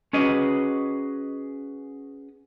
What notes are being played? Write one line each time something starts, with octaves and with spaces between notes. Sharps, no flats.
C#4 F#4 G#4 B4 D#5